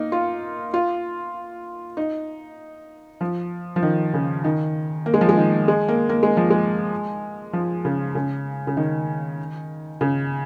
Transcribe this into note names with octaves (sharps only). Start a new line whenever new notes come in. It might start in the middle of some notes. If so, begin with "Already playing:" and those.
Already playing: A#3 D#4
F4
F4
D#4
F3
F3
D#3
C#3
D#3
A#3
G#3
F3
G#3
D#3
G#3
A#3
A#3
G#3
F3
G#3
F3
C#3
C#3
C#3
D#3
C#3